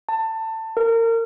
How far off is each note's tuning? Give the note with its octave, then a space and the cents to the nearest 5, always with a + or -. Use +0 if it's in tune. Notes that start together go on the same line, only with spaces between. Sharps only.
A5 +20
A#4 -30